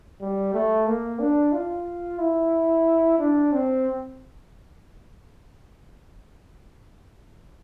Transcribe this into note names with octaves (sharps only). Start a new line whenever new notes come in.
G3
A3
A#3
D4
F4
E4
D4
C4